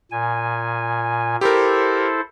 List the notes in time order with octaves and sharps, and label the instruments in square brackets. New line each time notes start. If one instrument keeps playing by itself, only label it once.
[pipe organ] A#2 G#5
[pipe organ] E4 A4 C5 [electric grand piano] G4 A#4